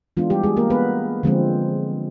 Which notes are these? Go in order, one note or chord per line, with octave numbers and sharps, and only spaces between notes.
E3 G#3 B3 D4 F4
G3 G4
G#3 G#4
A#3 A#4
B3 B4
D3 F3 G#3 C4